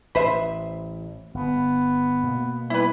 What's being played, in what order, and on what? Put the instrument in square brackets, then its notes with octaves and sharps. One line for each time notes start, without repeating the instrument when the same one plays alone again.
[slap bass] A1 [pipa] B4 C5 E5
[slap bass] G1 [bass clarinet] B3
[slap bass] B2 A#3
[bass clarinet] G3 [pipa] E4 B4